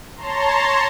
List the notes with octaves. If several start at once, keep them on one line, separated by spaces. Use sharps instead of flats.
C#5 A5 A#5 C6